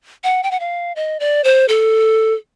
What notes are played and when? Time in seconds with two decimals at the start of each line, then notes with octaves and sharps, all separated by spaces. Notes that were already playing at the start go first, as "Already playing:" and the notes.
0.24 F#5
0.43 G5
0.51 F#5
0.60 F5
0.96 D#5
1.20 D5
1.44 C5
1.69 A4